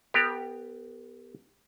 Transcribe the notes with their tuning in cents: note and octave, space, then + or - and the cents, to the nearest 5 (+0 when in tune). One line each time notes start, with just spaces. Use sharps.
B3 +0 G4 +10 A#4 -40